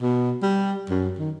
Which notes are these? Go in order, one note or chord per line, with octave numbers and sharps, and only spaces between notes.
B2
G3
F#2
D#3